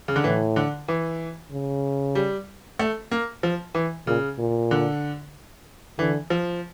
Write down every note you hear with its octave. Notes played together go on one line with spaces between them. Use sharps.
C#3
D3
A2 E3
D3
E3
C#3
G3
A3
A#3
F3
E3
A#2 C#3
A#2
D3
D3 E3
F3